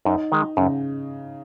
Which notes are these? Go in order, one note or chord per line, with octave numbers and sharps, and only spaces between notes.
F#2 D#4
D#3 G#3
F#2 C#3